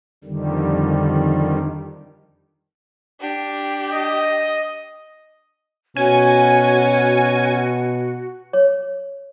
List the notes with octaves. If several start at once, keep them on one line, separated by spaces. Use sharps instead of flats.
F2 D3 D#3 G3
D4 G4
D#5
B2 C#4 F#4 G#5
C#5